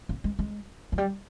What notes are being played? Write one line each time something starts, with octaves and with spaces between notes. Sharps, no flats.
A#3
G#3
G#3
F3
G3